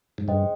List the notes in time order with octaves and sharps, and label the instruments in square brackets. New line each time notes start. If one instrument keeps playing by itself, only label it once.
[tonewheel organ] G#2
[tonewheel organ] G2 [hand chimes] G#4 C5 D#5 G5